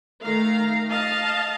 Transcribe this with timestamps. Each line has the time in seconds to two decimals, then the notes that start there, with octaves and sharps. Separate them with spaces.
0.23 D#3 A3 F5 A#5
0.89 D#5 F5 A5